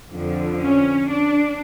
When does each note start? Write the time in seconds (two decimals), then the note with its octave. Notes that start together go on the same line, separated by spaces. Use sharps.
0.12 F2 D3 F3
0.60 C#4
1.08 D4